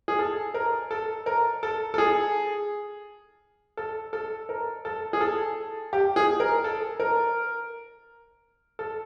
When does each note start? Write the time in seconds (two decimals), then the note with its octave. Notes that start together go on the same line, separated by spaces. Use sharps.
0.08 G#4
0.19 A4
0.54 A#4
0.91 A4
1.26 A#4
1.63 A4
1.94 A4
1.98 G#4
3.77 A4
4.13 A4
4.49 A#4
4.85 A4
5.13 G#4
5.21 A4
5.93 G4
6.16 G#4
6.40 A#4
6.64 A4
7.00 A#4
8.79 A4